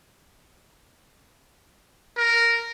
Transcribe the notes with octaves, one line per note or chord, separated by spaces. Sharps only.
A#4